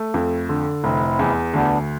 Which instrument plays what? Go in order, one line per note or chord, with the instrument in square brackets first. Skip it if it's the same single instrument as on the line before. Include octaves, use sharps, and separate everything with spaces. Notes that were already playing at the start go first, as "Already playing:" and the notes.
Already playing: [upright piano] A3
F2
D3
[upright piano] F1 [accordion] C4 E4
[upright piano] E2
[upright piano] D2 [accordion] B3 D4